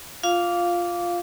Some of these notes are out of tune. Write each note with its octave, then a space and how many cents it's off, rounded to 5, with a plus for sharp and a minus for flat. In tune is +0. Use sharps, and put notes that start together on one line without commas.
F4 +0 F5 +0 D6 -20